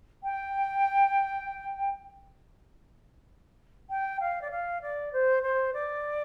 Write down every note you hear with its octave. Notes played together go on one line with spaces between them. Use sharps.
G5
G5
F5
D5
F5
D5
C5
C5
D5